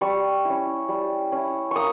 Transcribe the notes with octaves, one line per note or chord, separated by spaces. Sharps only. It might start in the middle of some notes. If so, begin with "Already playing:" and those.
G3 C#6
C#4 E4
G3
C#4 E4
A#3 C#6 D#6